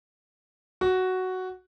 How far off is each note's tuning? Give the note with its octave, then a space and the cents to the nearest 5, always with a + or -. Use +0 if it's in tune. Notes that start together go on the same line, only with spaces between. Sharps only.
F#4 +5